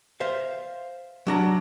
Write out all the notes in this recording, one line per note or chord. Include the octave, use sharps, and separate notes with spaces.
C5 E5 F5
F#3 D4 A#5